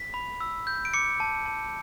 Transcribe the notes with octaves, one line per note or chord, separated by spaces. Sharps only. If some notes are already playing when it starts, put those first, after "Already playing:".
Already playing: B6
B5
E6
G6
D7
D6 C#7
A5
A5